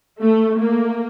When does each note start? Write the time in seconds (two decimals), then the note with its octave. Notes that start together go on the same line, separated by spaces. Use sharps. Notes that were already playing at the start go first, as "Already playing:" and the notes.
0.21 A3
0.60 A#3